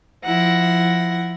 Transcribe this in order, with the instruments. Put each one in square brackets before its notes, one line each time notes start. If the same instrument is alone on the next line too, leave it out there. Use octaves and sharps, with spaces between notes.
[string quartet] F3 E4 F#5 A#6